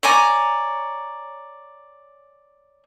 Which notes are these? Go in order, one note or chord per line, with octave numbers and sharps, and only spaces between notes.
C#5 D5 G#5 A#5